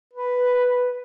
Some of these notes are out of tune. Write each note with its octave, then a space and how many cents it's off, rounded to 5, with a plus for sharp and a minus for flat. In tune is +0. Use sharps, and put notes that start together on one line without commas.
B4 +0